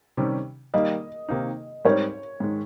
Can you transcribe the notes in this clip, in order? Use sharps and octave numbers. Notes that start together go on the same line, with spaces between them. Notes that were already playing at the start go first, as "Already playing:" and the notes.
C3 D#3 G3 C#4
D#3 G3 A#3 D#5
C3 D#3 A#3 D#4
G#2 G3 C4 D#4 A#4 C#5
G#2 D#3 G#3